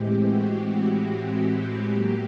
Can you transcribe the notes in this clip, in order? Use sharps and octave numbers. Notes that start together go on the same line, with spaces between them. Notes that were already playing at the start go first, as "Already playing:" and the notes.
Already playing: A2 E3 G#3 C4 G4
F#4
G4
A2 F#3 A#3